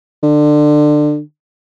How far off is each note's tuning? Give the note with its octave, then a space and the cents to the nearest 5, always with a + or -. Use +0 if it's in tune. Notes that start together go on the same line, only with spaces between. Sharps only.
D3 +25